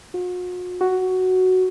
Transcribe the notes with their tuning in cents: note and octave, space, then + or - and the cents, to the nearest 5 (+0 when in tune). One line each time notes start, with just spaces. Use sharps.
F#4 -45
F#4 +5